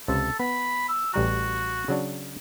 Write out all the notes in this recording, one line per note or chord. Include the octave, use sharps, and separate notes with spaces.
C#2 C3 A4
B3 B5
E6
A1 G3 F#4 A#5
C#3 F#3 D4